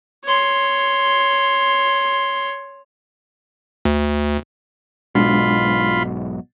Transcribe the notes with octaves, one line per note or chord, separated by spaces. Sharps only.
C#5 C6
D2
B1 G#2 B2 G#3 D4 F4 B5 C6